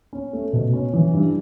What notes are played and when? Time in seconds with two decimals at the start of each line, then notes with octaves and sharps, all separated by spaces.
0.13 C#4
0.33 A3
0.53 B2
0.73 C#4
0.93 E3
1.13 G2